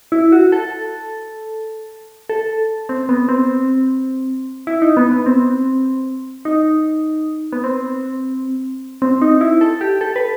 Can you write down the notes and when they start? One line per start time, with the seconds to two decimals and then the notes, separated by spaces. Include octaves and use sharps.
0.12 E4
0.32 F#4
0.52 A4
2.29 A4
2.89 C4
3.09 B3
3.29 C4
4.67 E4
4.82 D#4
4.97 B3
5.11 B3
5.26 C4
6.45 D#4
7.53 B3
7.64 C4
9.02 C4
9.22 D#4
9.41 E4
9.61 A4
9.81 G4
10.01 A4
10.16 B4